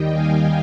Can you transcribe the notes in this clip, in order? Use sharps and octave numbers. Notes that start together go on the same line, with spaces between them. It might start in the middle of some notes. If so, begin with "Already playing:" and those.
Already playing: D#2 D#3 G3 D#5 G5
F5 G#5